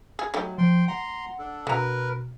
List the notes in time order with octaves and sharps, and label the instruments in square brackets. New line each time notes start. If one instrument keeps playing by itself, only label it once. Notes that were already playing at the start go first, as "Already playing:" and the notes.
[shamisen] G#4
[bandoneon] F#3 [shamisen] A3 D#4 G4
[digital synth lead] F3 [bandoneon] G5 C6
[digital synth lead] F#5 [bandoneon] A#5 C6
[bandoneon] D4 A4
[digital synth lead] B2 [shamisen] D3 A#5 [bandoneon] A#4 B4